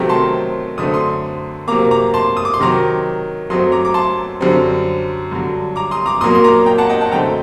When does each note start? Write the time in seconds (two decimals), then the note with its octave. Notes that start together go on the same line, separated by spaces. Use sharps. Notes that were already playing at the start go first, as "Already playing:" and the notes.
Already playing: C3 D#3 F#3 A3 C4 G5 A#5
0.09 A5 C6
0.78 F#2 D3 A3 C4 D#6
0.94 C6 D#6
1.68 C3 F#3 A#3 A#5 D6
1.91 A#5 D6
2.14 A5 C6
2.37 D#6
2.45 D6
2.54 C6
2.59 C3 D#3 F#3 A#5 D6
3.50 F#2 F#3 A3 C4 C6 D#6
3.72 A#5 D6
3.85 D6
3.94 A5 C6
4.40 F#2 D3 G3 C4
5.31 G2 D3 F#3
5.76 A#5 D6
5.91 C6 D#6
6.06 A#5 D6
6.21 A#2 F#3 A#3 C6 D#6
6.35 C6
6.44 A#5 D6
6.66 G5 A#5
6.78 F#5 A5
6.89 D#5 G5
7.01 F#5 A5
7.12 F#2 D3 A3 C4 G5 A#5